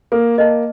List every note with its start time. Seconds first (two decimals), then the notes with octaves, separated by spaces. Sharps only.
0.12 A#3 A4
0.38 A#3 D#5 A5